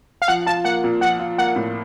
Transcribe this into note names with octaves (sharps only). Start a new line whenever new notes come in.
F5
F3 F#5
F4 A5
A#3 F#5
A#2
F3 F#5
F4
A#3 F#5
A2